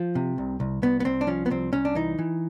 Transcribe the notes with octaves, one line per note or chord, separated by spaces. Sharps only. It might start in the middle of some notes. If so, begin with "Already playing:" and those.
Already playing: F3
C3
C2
C2
C2 B3
B3
C2 C4
D4
F3 C#4
B3
C2 C4
C2 C#4
D4
E3 D#4
E3